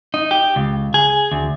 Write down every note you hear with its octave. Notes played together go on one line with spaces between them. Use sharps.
D#4
G4
C#2
G#4
D2